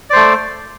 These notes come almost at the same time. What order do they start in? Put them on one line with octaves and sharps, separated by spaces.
D5 C5 A3